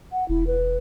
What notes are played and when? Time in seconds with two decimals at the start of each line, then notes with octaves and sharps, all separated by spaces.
0.12 F#5
0.29 E1 E4
0.47 B4